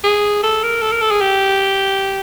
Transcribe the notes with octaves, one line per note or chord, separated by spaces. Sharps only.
G#4
A4
A#4
A4
A#4
A4
G#4
G4